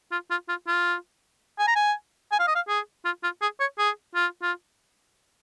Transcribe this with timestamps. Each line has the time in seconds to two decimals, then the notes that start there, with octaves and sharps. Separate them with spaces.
0.12 F4
0.31 F4
0.49 F4
0.67 F4
1.59 G#5
1.67 A#5
1.76 G#5
2.32 G#5
2.40 F5
2.48 D#5
2.55 F5
2.68 G#4
3.05 F4
3.23 F4
3.42 G#4
3.60 C#5
3.79 G#4
4.15 F4
4.43 F4